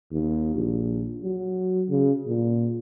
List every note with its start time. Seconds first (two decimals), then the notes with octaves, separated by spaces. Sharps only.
0.12 D#2
0.55 A#1
1.23 F#3
1.90 C#3
2.27 A#2